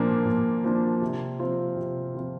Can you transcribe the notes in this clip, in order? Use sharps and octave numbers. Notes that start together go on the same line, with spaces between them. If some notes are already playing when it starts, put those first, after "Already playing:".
Already playing: A#2 F3 A#3 D4
A#2
F3 A#3 D4
C3
F3 C4 F4
C3
F3 C4 F4